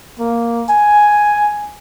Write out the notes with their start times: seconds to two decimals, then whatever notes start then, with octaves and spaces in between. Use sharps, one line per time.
0.20 A#3
0.69 G#5